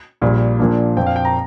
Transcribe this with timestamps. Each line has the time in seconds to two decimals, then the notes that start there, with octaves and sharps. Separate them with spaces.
0.21 A#1 A#2 G3
0.59 A#1 A#2 F3 A#3 D4
0.97 F2 F3 C4 G5
1.07 F5
1.16 G5
1.25 A#5